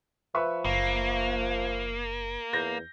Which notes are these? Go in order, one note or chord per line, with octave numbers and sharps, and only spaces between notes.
F3 B4 E5 C#6
F#1 A#3
E2 G6 A#6